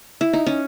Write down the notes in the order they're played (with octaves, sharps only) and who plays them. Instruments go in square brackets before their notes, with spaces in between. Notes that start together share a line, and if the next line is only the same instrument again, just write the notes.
[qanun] E4
D#4
C#4